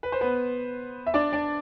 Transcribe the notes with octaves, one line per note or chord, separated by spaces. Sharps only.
B4
C5
B3 B4
E5
D4 D5
D4 D5